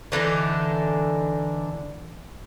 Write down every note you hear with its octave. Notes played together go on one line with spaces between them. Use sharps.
D3 E3 D4 D#4